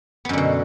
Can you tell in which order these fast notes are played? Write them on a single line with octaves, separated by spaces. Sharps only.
B3 F#2 D3 B2